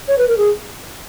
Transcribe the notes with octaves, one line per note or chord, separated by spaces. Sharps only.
C#5
B4
A#4
G#4